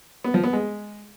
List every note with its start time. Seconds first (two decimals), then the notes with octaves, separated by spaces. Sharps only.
0.24 B3
0.34 F3
0.44 B3
0.53 G#3